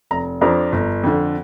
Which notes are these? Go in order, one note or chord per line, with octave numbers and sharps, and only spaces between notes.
F1 A#5
F2 F3 D4 A#5
G1
F2 D3